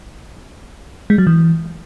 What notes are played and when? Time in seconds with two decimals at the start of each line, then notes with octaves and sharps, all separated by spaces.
1.10 G#3
1.18 F#3
1.27 E3